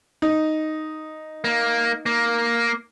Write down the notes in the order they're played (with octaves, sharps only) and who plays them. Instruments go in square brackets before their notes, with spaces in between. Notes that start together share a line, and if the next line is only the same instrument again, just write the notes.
[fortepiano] D#4
[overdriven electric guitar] A#3
A#3